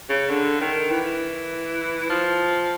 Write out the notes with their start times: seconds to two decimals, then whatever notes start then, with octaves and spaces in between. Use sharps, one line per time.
0.09 C#3
0.29 D3
0.60 D#3
0.90 E3
2.09 F3